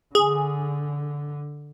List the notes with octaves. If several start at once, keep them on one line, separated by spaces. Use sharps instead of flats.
D3 G#4